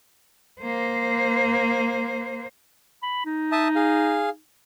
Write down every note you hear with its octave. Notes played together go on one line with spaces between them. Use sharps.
A#3 C5
B5
D#4
E5 A5 D#6
G#4 F5